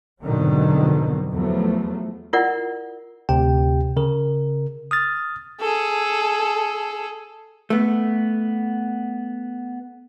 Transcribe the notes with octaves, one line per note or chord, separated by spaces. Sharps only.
F2 G#2 B2 D3 D#3 F#3
E2 F3 F#3 A3
E4 F4 A#4 D5 F#5
D2 C3 G4 G5
C#3 A#4
D#6 F6 A6
G#4 A4
A3 B3